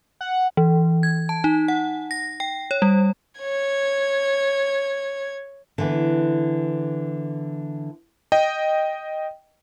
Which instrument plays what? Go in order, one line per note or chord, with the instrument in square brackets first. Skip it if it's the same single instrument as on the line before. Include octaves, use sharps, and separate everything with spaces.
[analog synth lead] F#5
[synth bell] E3
G#6
A5
D#4
F#5
A#6
G5
C#5
G3
[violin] C#5 G#6
[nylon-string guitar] D3 E3 B3
[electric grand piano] D#5 G5